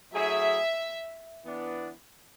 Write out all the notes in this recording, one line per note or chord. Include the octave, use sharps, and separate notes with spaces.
F#3 A3 E4 G#4 E5
E3 B3 D4